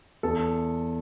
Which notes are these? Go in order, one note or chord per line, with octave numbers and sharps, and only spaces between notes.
E2 A4